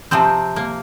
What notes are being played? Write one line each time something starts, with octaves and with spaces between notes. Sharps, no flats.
C3 F3 C4
A#3